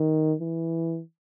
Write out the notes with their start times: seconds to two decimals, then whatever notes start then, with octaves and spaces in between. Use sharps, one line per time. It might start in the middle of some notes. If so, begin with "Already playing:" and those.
Already playing: D#3
0.41 E3